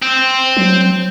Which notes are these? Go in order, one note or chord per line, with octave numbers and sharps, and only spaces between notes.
C4
F#3